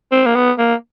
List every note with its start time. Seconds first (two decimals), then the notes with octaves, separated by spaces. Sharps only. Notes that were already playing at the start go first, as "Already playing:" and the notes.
0.12 C4
0.26 A#3
0.35 B3
0.58 A#3